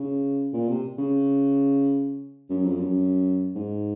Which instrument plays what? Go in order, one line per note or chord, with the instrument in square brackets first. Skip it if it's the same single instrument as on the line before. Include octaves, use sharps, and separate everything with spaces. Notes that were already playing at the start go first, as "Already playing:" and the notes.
Already playing: [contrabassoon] C#3
A#2
C3
C#3
F#2
F2
F#2
G#2